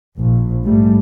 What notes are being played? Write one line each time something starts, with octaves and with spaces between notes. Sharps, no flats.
A#1
G#2 G3 A3